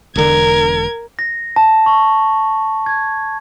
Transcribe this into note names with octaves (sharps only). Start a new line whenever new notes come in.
E1 D3 A#4 G#6
A#6
A5
C#6
G#6